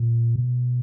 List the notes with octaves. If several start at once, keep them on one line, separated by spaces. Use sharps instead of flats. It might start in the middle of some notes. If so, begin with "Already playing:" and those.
Already playing: A#2
B2